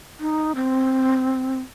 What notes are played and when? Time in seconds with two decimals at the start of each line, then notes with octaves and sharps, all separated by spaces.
0.20 D#4
0.55 C4